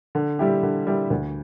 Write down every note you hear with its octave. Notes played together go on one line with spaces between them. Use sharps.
D3
G3 E4 G4
D3
G3 E4 G4
D2